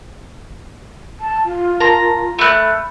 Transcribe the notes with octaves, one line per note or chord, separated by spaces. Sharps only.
A5
F4
A#4 A5 A#5 C6
A3 B5 F#6